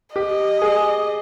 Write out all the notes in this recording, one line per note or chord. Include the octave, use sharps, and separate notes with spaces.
G4 D#5
G#4